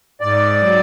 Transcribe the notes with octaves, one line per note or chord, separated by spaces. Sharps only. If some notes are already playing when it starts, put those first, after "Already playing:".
G#2 D5
F#3